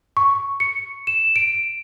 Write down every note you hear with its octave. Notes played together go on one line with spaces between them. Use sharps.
C#6
C#7
E7
D7